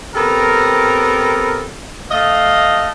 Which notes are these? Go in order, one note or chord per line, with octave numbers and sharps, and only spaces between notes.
B3 C4 G4 A4 A#4
A3 D#5 F5